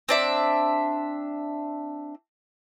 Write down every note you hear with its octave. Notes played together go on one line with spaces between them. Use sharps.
C4 D4 E5